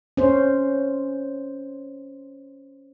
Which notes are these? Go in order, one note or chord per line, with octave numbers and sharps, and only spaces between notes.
C#4 C5